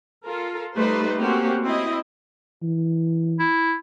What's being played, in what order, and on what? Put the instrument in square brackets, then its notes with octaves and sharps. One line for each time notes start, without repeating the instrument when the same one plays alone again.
[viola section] F4 A4 A#4
G3 A3 D#4 B4 C5
A3 A#3 C4 C#4 F#4 G4
C4 E4 D#5
[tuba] E3
[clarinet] E4